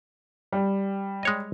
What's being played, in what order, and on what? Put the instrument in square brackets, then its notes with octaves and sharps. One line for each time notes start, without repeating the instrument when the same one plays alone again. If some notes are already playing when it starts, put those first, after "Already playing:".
[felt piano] G3
[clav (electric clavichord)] G#3 C#5 D#5